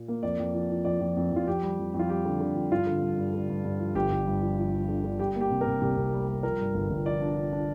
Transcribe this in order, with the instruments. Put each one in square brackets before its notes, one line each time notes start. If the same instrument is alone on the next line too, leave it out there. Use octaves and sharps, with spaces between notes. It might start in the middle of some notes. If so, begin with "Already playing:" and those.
Already playing: [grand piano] A#2
A#3
F2 D5
F2
F3
F3
F2 D5
F2
F2
F2 F4
F2 G4
G3
F2
F2
F4
G3 G4
D3
D3
F2
G2 F4
D3
G2
G2
D3
G2
G2
F3
G1 G4
G1
G2
F3
F3
F3
D3
D3
G3 G4
A#3
G4
C3
A#4
C3
C2 G4
C3
G3
G3
F3 A#4
G2
G1
G1
F3 D5
D4
D4
D4